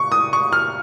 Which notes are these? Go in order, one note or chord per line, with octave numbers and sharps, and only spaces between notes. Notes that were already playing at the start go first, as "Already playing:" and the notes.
Already playing: A#2 C#6
D#6
C#6
F6